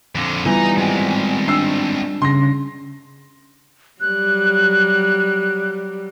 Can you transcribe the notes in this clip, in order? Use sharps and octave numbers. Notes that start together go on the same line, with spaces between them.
F2 D3
E3 G3 B3 D#4 F4 A#5
G#3 C4
D4 E6 C7
C#3 C6 A#6
F#3 G3 F#6